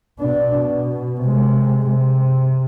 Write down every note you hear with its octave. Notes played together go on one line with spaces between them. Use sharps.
B2 D4
B2
C3 G#3
C3